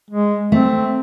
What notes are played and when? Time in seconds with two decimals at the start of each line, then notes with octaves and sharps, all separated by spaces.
0.10 G#3
0.52 A3 C4